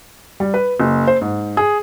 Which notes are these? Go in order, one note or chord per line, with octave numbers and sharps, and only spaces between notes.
G3
B4
F#1
C5
G#2
G#4